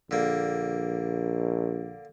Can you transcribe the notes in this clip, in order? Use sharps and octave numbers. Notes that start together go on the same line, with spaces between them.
A#1 D3 A#3